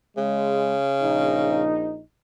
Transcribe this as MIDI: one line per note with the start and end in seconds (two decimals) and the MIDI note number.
0.17 1.66 49
0.17 0.75 56
1.03 2.01 34
1.03 2.01 63